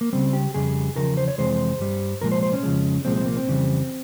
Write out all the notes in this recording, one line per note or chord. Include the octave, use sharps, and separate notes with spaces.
A#3
C#2 C#3 G3 C4
G4
F2 C#3 G3 G#4
E2 C#3 F3 A#4
C5
C#5
F2 C3 E3 G#3 C5
G2 G3
C2 A#2 F3 G#3 A#4
C5
C5
C#4
F2 C#3 F3 G#3
C2 A#2 F3 G#3 C4
C4
A#3
C4
F2 C#3 E3 G3